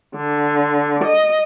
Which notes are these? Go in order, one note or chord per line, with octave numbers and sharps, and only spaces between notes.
D3
D#5